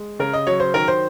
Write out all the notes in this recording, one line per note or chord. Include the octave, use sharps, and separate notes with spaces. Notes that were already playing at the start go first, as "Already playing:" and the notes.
Already playing: G#3
C#3 A#4
D#5
F#3 C#5
C5
D#3 A#4
C5